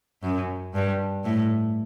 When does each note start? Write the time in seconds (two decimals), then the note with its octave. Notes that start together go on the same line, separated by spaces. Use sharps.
0.23 F#2
0.74 G2
1.25 A2